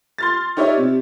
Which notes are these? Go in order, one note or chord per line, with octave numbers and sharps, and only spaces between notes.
C6 F6 A6
D#4 G4 C#5 D5 E5
C3